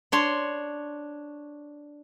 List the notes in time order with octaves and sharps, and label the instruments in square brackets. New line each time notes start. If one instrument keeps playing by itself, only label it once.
[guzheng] D4 C#5 C6